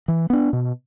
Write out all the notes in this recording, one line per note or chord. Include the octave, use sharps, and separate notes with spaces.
E3
B3 D4
B2